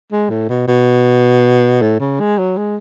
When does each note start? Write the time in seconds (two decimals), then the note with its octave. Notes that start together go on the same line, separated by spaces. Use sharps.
0.12 G#3
0.30 A2
0.49 B2
0.68 B2
1.82 A2
2.00 C#3
2.20 G#3
2.38 F#3
2.57 G#3